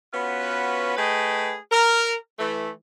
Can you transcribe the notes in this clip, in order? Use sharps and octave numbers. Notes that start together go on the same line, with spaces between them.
B3 C#4 F4 F#4 B4
A3 G#4 B4 D#5 G5
A#4
E3 A3